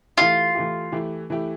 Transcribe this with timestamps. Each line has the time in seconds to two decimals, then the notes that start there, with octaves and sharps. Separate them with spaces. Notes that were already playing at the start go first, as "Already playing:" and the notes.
0.17 E3 A3 E4 F4 G4
0.55 E3 A3 E4 G4
0.92 E3 A3 E4 G4
1.30 E3 A3 E4 G4